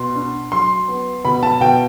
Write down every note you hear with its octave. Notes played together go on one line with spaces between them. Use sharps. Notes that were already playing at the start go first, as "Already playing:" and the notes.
Already playing: B2 C6
D4
F#3 C6
B3
B2 B5
A5
B2 G5